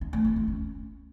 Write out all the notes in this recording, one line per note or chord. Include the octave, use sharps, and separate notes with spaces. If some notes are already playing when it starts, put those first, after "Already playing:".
D#4
A3
F4
D#4
C#4